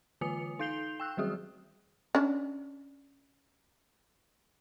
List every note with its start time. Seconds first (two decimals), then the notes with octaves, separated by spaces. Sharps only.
0.21 D3 E3 F4 G#5 D#6 C#7
0.59 D#4 F5 G6 C7 F7 G7
1.00 G5 E6 F#6
1.17 D#3 F#3 G3 F#4 G#4 D#6
2.15 C#4 D4